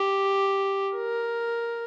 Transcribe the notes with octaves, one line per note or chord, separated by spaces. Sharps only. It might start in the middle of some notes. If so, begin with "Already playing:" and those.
Already playing: G4
A#4